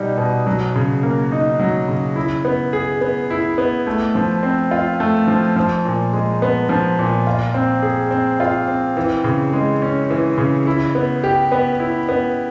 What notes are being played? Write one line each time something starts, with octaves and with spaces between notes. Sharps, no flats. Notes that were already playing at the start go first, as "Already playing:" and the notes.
Already playing: B2 G3 D#4
B2
F#3
C#3
A#3
D#4
F#3
C#3
E4
B3
G#4
B3
E4
B3
A3
F3
C4
F4
A3
F3
F3
A#2
G#3
B3
F3
A#2
F4
C4
G#4
C4
F4
C4
E3
C#3
G#3
C#4
E3
C#3
E4
B3
G4
B3
E4
B3